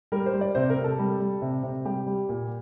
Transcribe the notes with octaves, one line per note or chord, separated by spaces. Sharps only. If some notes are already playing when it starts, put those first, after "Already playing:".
G3 A#4
C5
G3
D5
C3 C5
A#4
C3
A4
G3
G3
C3
C3
G3 G4
G3
A#2